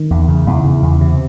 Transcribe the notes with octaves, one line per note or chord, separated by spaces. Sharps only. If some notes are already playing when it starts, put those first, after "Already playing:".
Already playing: D#3
E2
C#3
E2
C#3
E2
C3